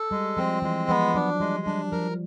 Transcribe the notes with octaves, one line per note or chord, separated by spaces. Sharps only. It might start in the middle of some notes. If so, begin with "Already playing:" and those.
Already playing: A4
G3 G#3
F3 C4
E3 G#3
F3 B3
F#3 D4
G3 G#3
G3 D4
F3 A#4